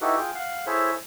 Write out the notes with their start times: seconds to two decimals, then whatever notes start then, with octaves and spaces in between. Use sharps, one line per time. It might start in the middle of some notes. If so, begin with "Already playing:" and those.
0.01 D#4 E4 F#4 G4 A4 B4
0.18 F4 G#4 G5
0.35 F5 F#5
0.67 E4 G#4 A4 C5 C#5 E5